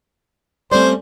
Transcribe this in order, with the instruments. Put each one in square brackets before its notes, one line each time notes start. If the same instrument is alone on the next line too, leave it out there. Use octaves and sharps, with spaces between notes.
[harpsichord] G3 A3 C#4 [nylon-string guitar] C4 D5 [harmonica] C5